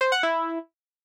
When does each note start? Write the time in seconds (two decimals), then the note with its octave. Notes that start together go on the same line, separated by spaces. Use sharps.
0.01 C5
0.12 F#5
0.23 E4